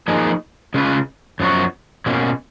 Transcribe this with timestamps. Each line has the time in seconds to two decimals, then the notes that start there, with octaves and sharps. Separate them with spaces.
0.08 F3 A#3 D#4 G#4
0.74 C#3 G#3 C#4 F4 B4
1.40 F#2 F3 B3 F#4 C#5
2.06 B2 A#3 C#4